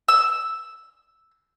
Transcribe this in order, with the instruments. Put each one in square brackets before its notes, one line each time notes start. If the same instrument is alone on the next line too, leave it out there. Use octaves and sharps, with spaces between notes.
[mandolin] E6